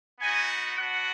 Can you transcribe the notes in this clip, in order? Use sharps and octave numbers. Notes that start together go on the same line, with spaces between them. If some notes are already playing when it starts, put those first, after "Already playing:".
B3 D#4 F#4 G#5
B3 D4 F#4 F#5